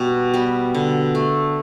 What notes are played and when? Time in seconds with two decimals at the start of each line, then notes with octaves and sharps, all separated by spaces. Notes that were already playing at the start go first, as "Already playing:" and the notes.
Already playing: B2 G3 B3 F#4
0.34 G3 B3
0.74 D3
1.15 A3